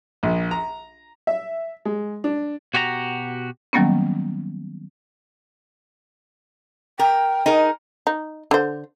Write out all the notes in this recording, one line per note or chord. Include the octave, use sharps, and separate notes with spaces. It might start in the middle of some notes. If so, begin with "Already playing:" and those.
A#1
A#5
E5
G#3
D4
B2 F#4 G4 C#5 A#5
D#3 F#3 G3 A#3 B3 C#4
A#4 G5
D#4 G#4 A#4
D#4
D3 C5